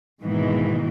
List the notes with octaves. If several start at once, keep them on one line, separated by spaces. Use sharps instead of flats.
G#2 B2 D#3 E3 G#3 A#3